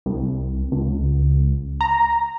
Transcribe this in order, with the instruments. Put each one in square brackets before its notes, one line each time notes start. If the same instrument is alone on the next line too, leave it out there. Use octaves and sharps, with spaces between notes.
[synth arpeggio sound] C2
C#2
A#5